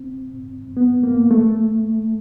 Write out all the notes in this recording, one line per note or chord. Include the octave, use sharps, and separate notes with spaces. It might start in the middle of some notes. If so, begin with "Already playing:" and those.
Already playing: C4
B3
A#3
A3